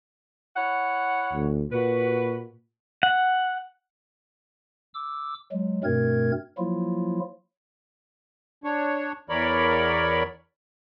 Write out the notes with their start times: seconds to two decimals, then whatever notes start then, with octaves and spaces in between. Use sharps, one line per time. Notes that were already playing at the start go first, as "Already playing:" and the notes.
0.56 E4 C#5 F#5
1.33 D2
1.72 A#2 F#4 B4
3.03 F#5
4.94 D6 E6
5.52 F#3 G#3
5.84 G2 B2 A3 C4 A#4 G#6
6.58 F3 F#3 A#3 E4 F4
8.64 D4 C#5
9.29 E2 E3 A#4 C#5 D5 B5